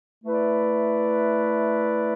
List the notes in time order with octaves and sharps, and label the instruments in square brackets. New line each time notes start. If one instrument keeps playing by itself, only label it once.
[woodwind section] A3 E4 B4 D5